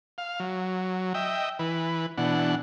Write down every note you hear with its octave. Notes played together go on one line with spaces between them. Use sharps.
F5
F#3
D#5 E5 G5
E3 B4
B2 E3 D4 F#5